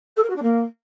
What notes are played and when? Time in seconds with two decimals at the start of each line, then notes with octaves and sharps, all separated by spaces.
0.16 A4
0.23 A#4
0.29 F#4
0.36 D4
0.42 A#3